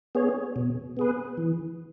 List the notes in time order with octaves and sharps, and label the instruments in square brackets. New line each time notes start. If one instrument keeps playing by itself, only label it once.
[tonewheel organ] B3 G#4 C#5
B2
B3 G#4 B4
E3